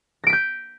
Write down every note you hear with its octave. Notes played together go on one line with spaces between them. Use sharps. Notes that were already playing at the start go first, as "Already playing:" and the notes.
G6 A#6 B6 D7